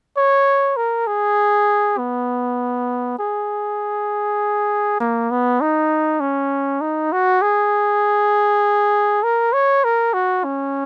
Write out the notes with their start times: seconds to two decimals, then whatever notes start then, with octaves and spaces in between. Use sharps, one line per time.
0.17 C#5
0.76 A#4
1.07 G#4
1.98 B3
3.19 G#4
5.00 A#3
5.31 B3
5.61 D#4
6.20 C#4
6.81 D#4
7.12 F#4
7.42 G#4
9.23 A#4
9.53 C#5
9.84 A#4
10.14 F#4
10.44 C#4